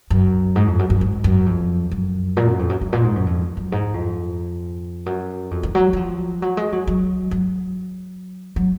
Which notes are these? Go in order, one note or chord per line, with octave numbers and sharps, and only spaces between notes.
F#2
G#2
F2
F#2
F#2
G#2
F#2
F2
F#2
A#2
F#2
F2
F#2
F#2
A#2
G#2
F#2
F2
F#2
G#2
F2
F#2
F2
D#3
F#3
F#3
F3
F#3
G#3
F#3
F#3
F#3
F#3